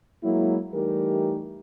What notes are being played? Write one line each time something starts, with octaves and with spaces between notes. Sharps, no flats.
F#3 G#3 A#3 E4
E3 G3 A3 D#4 G4 A#4